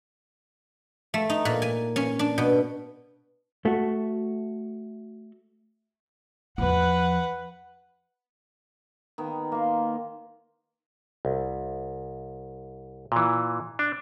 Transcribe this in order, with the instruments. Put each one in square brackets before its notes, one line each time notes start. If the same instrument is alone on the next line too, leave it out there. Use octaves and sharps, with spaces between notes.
[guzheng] A3
D#4
A#2
G#5
C#4
D4
B2
[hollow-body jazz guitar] A3 F#4
[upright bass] E2 F3 [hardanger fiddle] B4 F#5
[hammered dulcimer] D#3 B3
A#3 C6
[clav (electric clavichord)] C2
A#2 E3
D4